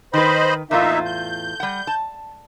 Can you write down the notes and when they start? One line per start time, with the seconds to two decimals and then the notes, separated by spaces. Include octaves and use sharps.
0.14 D#3 B4 C5 D#5 B5
0.71 E2 A2 A#3 D#4 F4 E5
1.06 G6
1.60 G3 F#5
1.87 A5